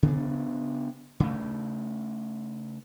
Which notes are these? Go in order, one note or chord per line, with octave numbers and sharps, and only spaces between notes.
C#3 B3 D4
C#3 A3